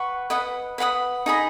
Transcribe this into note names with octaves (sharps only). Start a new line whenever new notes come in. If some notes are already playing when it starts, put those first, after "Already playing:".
Already playing: B4 F#5 C#6
B4 D#5 F#5 B5
B4 F#5 B5 D#6
D#4 G#4 D#5 B5